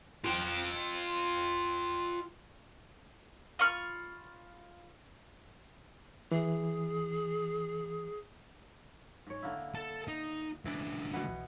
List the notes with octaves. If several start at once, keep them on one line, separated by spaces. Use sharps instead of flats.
F4 G5
F4 B5 C#6 F6
E3 G#4
G#2 C#5
D3 A#3 E4
A4 A5
D#4
C#2 E3 D4 E5
B2 E3 B3